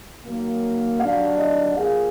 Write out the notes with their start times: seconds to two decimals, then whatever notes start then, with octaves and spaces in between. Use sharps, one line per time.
0.22 D#3 F#3 A#3
0.99 D#2 D3 F#3 D4 F#4 F5
1.38 D#5
1.76 F3 A#3 F4 G#4 F5